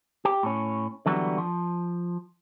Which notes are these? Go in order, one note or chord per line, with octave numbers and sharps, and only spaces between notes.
G4
A2 C#4
D3 E3 F#3 G3 B3
F3